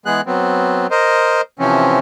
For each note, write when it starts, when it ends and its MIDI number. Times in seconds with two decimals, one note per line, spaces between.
0.06 0.21 52
0.06 0.21 56
0.06 0.21 59
0.06 0.21 68
0.06 0.21 90
0.26 0.87 54
0.26 0.87 59
0.26 0.87 60
0.91 1.41 70
0.91 1.41 72
0.91 1.41 75
1.59 1.99 48
1.59 1.99 52
1.59 1.99 53
1.59 1.99 60
1.59 1.99 61